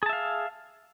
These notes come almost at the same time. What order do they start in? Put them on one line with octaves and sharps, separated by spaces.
G#4 A5 E5 F5